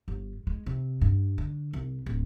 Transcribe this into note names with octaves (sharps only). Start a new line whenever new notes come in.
G1
G#3
C3
G2
D3
C2
D1